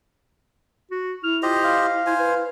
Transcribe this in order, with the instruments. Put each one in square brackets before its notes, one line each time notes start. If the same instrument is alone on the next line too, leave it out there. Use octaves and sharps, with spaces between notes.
[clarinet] F#4
[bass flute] E4 [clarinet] F6
[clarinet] F4 [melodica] G4 C5 D#5
[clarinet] F5
[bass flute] E4 [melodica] C5 G#5
[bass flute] B4